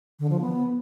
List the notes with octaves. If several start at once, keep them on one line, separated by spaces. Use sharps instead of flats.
D3
F3
B3